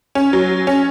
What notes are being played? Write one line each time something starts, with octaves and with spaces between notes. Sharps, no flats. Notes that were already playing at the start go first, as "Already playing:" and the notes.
C#4
F#3
C#4